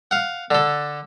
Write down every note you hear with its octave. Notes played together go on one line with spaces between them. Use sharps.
F5 F#5
D3 A4